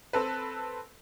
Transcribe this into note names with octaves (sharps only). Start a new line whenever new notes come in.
C4 A4 B4